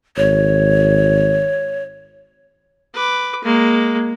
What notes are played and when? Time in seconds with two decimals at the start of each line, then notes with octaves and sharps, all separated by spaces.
0.17 G#1 C#5
2.94 B4 D6
3.44 G#3 A#3